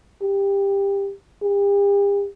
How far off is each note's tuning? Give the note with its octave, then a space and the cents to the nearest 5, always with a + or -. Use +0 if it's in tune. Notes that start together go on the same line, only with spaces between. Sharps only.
G4 +20
G4 +40